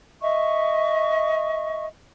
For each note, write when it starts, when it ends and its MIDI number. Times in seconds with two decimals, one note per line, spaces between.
0.21 1.86 75
0.21 1.86 76
0.21 1.86 85